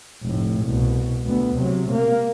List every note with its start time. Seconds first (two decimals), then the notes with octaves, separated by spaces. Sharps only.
0.23 F1 A2
0.64 C2 B2
1.26 D2 B3
1.58 C3 F#3
1.92 A#3